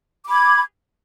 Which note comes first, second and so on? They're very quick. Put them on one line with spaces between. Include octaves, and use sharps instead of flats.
D6 B5 G#6